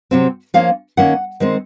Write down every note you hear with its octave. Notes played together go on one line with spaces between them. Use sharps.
C3 F#3 C4
F3 A#3 C#4 F5
D#3 A#3 C#4 F#5
D#3 G#3 C4